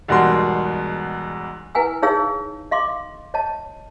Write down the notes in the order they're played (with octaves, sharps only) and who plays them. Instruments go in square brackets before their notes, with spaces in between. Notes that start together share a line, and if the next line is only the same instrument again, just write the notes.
[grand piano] E2 G#2 B2 G3 A#4 C6
[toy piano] E4 B4 F#5 G#5 E6
D#4 G#4 C#5 F5 E6
D#5 F5 C6 D6
C#5 D#5 A5